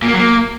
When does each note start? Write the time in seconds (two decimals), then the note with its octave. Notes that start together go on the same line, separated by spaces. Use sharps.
0.02 A#2
0.08 A#3
0.13 F#3
0.19 A#3